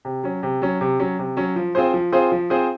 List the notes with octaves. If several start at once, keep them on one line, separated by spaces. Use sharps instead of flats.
C3
F#3 C#4
C3
F#3 C#4
C3
F#3 C#4
C3
F#3 C#4
F3
C4 F4 G#4 C5
F3
C4 F4 G#4 C5
F3
C4 F4 G#4 C5